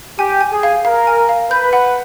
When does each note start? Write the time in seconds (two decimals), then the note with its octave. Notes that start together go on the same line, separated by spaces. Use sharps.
0.19 G4 G#5
0.41 G#5
0.52 G#4
0.63 F5
0.85 A#4 F5
1.07 G#5
1.29 F5
1.51 B4 G6
1.73 F#5